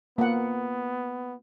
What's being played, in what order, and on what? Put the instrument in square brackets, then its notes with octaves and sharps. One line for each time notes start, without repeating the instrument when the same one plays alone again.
[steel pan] A#3 F#5 [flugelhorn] B3